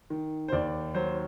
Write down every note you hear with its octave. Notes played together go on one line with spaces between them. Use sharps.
D#3
C5
D#2 D5
F#3 C5